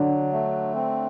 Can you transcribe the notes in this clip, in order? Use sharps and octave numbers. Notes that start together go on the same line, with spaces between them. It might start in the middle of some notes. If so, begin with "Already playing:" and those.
Already playing: D3 F#3 D4
A3
C4